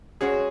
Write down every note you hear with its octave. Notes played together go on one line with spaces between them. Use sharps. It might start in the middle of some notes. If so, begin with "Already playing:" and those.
G#3 C#4 F#4 G#4 C#5